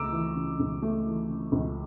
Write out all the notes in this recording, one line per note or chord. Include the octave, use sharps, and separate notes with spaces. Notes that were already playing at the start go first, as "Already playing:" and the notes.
Already playing: C#2 C#3 A3 A#5 D6 E6
E3
C#3
C#2
A3
E3
C#3
C#2